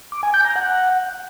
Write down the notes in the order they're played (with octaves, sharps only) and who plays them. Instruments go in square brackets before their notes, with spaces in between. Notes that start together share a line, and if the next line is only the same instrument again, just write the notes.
[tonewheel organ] D6
G#5
G6
A#5
F#5